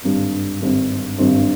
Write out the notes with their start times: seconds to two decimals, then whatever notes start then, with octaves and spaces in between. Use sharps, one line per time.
0.02 G#1 G2 D3
0.60 G#1 G2 D3
1.18 G#1 G2 D3